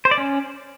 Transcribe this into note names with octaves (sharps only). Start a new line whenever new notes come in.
C5
D5
C#4